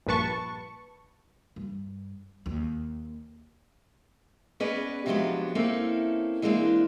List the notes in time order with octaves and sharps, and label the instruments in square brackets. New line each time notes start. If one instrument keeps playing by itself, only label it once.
[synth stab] A#1 G2 A#2 B4 A5 C#6
[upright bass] G2
D#2
[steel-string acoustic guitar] B3 C#4 G#4 B4 D5 D#5
C3 F3 F#3 G#3 B3 D4
A#3 C4 C#4 D#4 E4 A4
E3 G#3 A#3 C4 D4